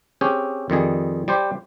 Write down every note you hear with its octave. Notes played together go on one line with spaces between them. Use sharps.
C4 C#4 G4 G#4
F2 D#3 G3 G#4
G3 G4 C5